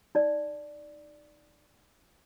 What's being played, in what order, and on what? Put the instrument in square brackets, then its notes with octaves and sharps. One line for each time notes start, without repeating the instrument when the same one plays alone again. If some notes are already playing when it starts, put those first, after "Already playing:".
[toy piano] D#4 D5